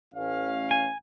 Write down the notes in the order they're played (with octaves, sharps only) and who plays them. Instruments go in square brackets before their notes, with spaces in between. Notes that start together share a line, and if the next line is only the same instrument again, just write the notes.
[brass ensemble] A1 C#4 F5
[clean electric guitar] G#5